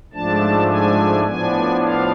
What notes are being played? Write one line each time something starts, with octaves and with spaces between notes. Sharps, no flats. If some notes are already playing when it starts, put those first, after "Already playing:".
G#2 F3 A3 D4 A5
G#5
A2 F3 B3 D4 G#5
F5